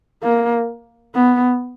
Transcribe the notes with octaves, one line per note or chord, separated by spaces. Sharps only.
A#3
B3